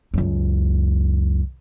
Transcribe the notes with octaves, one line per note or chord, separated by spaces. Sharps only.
C#2 F#2